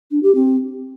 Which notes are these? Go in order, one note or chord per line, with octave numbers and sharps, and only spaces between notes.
D4
G4
C4